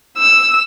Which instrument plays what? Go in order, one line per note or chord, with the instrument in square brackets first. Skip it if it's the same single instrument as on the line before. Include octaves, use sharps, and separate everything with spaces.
[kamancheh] E6